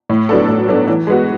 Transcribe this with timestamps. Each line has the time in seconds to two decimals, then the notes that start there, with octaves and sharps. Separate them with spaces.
0.09 A2
0.29 F#3 B3 D4 A4
0.48 A2
0.68 F#3 B3 D4 A4
0.88 E3
1.07 G#3 B3 F#4